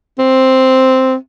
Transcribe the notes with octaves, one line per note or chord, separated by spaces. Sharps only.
C4